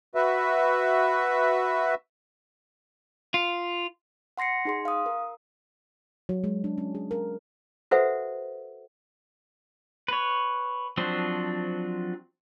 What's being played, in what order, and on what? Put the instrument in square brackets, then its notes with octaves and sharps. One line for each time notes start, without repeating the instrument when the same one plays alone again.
[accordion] F#4 B4 E5
[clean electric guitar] F4
[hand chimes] F#5 C6 A#6 C7 C#7
D#4 G#4 C6
F5 D#6
A#4
[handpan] F#3
G#3
D4
C#4
G#4
A#4
[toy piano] F#4 A4 B4 C5 E5 F#5
[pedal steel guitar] B4 C#5
F3 F#3 C4 D4 C5